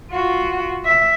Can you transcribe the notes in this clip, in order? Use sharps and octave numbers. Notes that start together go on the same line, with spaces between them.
F4 F#4
E5